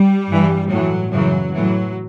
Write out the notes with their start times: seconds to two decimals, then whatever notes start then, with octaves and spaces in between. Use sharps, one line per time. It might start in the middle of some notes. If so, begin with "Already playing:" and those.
Already playing: G3
0.29 G2 E3
0.70 A2 E3 F#3
1.12 F#2 C#3 E3 F#3
1.55 A2 E3 F#3